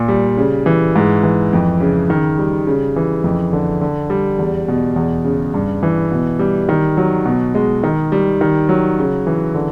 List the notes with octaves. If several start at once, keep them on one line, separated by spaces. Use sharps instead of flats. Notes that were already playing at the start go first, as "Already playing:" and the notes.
Already playing: A#2
G3
C#3
E3
G#2
E3
F2
C#3
D#3
G3
C#3
E3
F2
D3
D3
G3
E2
B2
E2
C#3
G2
E3
B2
G3
D#3
F#3
B2
G#3
D#3
G3
D#3
F#3
C#3
E3
D3